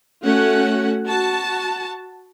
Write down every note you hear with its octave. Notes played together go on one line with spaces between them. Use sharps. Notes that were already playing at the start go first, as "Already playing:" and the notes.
A3 C#4 F#4 F#5
F#4 A5